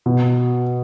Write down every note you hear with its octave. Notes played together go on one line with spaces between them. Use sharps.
B2